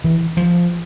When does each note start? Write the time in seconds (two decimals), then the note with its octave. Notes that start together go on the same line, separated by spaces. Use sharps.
0.04 E3
0.37 F3